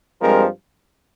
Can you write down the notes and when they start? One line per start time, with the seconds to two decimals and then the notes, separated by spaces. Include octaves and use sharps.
0.20 G2 F3 G#3 C4 A#4